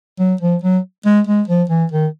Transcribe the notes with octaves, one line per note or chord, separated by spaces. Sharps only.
F#3
F3
F#3
G#3
G#3
F3
E3
D#3